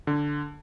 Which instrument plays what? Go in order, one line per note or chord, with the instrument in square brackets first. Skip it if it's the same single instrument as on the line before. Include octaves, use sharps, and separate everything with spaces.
[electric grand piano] D3